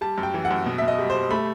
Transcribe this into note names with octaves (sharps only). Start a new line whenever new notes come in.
G3 A5
F#2
G5
E3
F#5
F#2
B2
B2 E5
D#5
G3
C5
G3
A3 B5